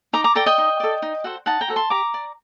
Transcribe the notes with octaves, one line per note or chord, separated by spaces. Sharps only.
D#4 A#5 D6
A#5 D6
A4 D5 G5 A#5
D#5 G5
D#4
A4 D5
D#4
F#4 A4 C5
D#4 F#5 A5
G5 A#5
F#4 A4 C5
A5 C6
G4 A#5 D6
D5